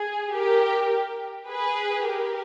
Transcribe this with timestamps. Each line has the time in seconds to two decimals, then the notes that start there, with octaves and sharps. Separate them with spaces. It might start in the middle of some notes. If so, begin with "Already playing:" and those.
Already playing: G#4
0.32 G4 A#4
1.48 G#4 B4
2.05 G4 A#4